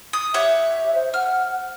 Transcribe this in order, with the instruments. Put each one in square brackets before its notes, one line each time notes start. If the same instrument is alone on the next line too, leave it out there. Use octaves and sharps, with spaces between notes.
[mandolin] D#6
[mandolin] G4 C#5 F#5 [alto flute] E5
[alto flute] C5
[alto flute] F#5 [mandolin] F6